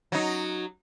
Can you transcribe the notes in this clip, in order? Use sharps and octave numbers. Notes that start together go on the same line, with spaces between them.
F#3 D#4